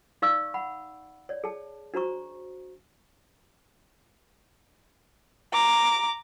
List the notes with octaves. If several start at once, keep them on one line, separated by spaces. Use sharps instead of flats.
D#4 D5 F5 C#6 E6
F#5 B5
C#5 D5
G#4 A5
D4 F#4 C5 A#5 C#6
A#5 D6